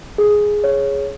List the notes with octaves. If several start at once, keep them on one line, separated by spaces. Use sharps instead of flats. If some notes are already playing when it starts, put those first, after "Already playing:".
G#4
C#5